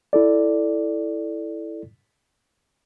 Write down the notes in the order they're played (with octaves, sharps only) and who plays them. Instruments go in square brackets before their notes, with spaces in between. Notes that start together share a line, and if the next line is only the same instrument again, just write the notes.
[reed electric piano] E4 A4 D5